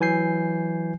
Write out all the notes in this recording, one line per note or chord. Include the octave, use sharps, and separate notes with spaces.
E3 F#3 G#5 G6 C7